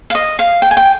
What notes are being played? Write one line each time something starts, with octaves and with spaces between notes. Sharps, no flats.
F5
D#5
F5
G5
G#5
G5